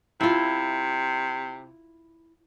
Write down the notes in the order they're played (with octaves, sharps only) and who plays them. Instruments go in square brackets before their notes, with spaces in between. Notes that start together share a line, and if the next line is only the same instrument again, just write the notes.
[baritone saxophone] C3 [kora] E4 F4